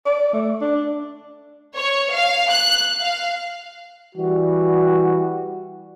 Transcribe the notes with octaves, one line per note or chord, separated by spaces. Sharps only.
D5
A3
D4
C#5
F5
F#6
F5
E3 G3 F#4